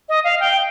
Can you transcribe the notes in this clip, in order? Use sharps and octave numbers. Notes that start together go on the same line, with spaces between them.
D#5
F5
G5